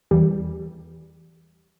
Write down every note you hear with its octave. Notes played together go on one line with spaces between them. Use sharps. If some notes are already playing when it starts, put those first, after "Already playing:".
E2 E3 G3